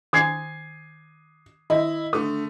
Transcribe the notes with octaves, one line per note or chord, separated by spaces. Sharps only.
D#3 G#5 D#6 G#6 C7
D#3 E4 D#5
D3 A3 D#6